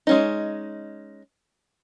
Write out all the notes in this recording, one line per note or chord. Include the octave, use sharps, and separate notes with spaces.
G#3 C#4 D#4